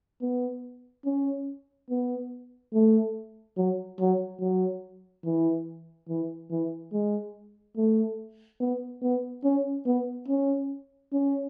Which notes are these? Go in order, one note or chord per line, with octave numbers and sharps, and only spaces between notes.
B3
C#4
B3
A3
F#3
F#3
F#3
E3
E3
E3
G#3
A3
B3
B3
C#4
B3
C#4
C#4